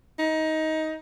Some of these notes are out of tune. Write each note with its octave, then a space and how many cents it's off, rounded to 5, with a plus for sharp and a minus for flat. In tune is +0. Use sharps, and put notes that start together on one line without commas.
D#4 +20